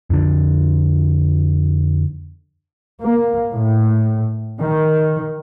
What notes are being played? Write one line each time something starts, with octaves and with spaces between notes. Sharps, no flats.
F2 D3
A#3
A2
D#3